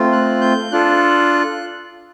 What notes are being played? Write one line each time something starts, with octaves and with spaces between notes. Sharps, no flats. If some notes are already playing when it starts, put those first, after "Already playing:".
Already playing: A3 C4 F4
F#6
G6
D4 F4 A4 F#6